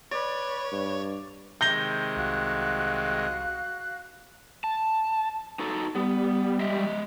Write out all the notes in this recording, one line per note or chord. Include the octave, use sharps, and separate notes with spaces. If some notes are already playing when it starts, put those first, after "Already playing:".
B4 C#5 D5
G2
C3 D#3 G#3 G6 A#6 G7
C2 F#4 F5 F#6
A5
D#4 F#4 A4
G3 B3
G#3 D#5 E5